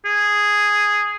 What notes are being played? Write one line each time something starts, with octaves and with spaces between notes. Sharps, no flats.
G#4